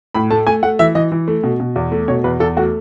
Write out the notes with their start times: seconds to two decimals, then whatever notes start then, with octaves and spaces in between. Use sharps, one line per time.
0.14 A2 B5
0.30 A3 A5
0.47 A3 G#5
0.63 A3 F#5
0.79 E3 E5
0.95 E3 D#5
1.12 E3
1.28 A3
1.44 B2
1.60 B2
1.76 E2
1.92 A3
2.08 B2 C#5
2.24 E2 B4
2.40 E2 A4
2.57 A3 F#4